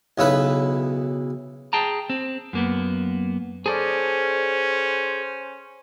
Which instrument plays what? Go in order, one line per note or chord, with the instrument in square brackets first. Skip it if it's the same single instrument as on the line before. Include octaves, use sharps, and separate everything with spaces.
[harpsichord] B1 C#3 E4 B4
[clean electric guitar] G#4 G5 A5 A#5
C4
F#2 A#3 B3
[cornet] C#4 [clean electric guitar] G#4 A4 D5 [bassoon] C5